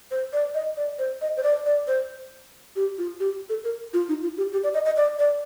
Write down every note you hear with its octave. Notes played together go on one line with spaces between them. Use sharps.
C5
D5
D#5
D5
C5
D#5
C5
D5
D5
C5
G4
F4
G4
A4
A#4
F4
D#4
F4
G4
G4
D5
D#5
D#5
D5
D5